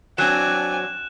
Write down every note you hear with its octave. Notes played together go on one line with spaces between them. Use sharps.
F#3 C4 D4 G#5 F#6 E7